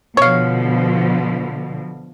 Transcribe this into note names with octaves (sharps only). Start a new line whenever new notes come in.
B2 D3 F3 C#5 F5